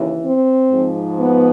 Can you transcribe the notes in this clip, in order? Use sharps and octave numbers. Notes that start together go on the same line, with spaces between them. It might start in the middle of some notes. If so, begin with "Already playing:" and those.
Already playing: D#2 C#3 E3
C4
G#2 F3
B3